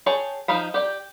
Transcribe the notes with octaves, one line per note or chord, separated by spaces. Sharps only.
G#4 C#5 G5 A5
F3 D#4 F5 B5
G4 D5 G5